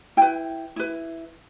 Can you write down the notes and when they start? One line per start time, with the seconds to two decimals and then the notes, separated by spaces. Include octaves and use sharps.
0.17 E4 B4 G5
0.76 E4 B4